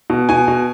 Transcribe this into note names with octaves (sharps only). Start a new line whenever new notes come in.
B2
B2 G#5
B2